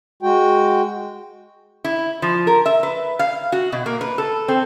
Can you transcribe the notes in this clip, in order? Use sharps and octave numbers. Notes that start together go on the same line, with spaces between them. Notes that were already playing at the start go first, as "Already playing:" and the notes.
G#3 F#4 G5
E4
F3
A#4
E5
B4
F5
F#4
B2
A#3
B4
A4
C4